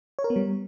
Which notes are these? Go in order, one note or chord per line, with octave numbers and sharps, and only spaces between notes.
C#5
A#4
B3
G3